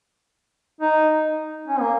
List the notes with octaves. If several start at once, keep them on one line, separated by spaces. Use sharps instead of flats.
D#4
C#4
A#3